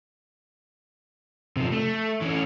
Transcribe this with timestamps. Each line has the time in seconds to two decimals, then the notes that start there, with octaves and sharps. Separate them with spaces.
1.57 C3 F3
1.72 A3
2.21 E3 C#4